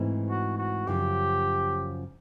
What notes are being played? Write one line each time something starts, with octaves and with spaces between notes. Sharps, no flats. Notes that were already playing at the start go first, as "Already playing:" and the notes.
Already playing: G#2 E3 A3 C4
F#4
F#4
F#2 C#3 F3 G4